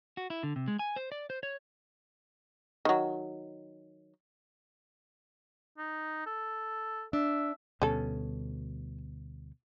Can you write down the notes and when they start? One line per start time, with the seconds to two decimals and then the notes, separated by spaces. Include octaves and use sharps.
0.17 F#4
0.30 E4
0.43 D3
0.56 C3
0.68 G#3
0.79 G#5
0.96 C5
1.12 D5
1.30 C5
1.43 C#5
2.85 D#3 F#3
5.78 D#4
6.26 A4
7.13 D4 E5
7.82 D2 B2 G3 C#4 A4